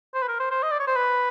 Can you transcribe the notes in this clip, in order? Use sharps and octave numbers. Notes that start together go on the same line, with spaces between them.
C5
B4
A#4
C5
C5
D#5
D5
C#5
C5
B4